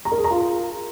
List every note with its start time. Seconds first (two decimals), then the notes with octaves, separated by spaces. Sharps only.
0.05 A#5
0.12 A#4
0.18 G#4
0.24 A#5
0.31 F4